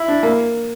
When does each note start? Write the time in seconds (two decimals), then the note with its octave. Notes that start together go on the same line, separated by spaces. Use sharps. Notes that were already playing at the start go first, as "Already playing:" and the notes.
Already playing: E4
0.08 D4
0.23 A#3